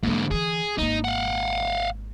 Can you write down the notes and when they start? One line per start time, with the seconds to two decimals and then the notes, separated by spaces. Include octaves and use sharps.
0.03 G#2 D3 F#3 A#3
0.31 D3 E3 G#4
0.78 G#1 A#3 D#4
1.04 F5 F#5